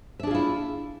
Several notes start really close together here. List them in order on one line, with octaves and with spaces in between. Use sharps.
E5 D4 G#4 F4 E4